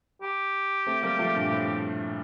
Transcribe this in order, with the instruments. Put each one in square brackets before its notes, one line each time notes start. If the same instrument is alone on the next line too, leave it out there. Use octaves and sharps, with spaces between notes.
[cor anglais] G4
[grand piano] A3 C4
G3 A#3
F3 A3
G2 A#2
A2